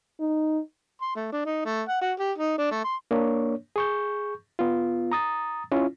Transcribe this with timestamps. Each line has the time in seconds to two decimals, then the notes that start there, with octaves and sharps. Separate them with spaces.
0.20 D#4
1.02 C6
1.16 A3
1.33 D4
1.46 D#4
1.65 A3
1.89 F#5
2.02 F#4
2.20 G4
2.38 D#4
2.58 D4
2.71 A3
2.84 C6
3.11 A#3 D4 C#5
3.76 G#4 C#6 G6
4.59 B3 F4
5.12 A#5 D#6 A6
5.72 C#4 E4 F4